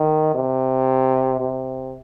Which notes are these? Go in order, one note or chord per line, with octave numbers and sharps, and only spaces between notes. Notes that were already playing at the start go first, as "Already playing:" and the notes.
Already playing: D#3
C3
C3